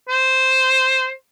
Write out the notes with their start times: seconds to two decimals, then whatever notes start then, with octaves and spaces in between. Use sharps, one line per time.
0.09 C5